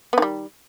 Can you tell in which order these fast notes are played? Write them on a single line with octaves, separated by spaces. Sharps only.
B3 D#3 G3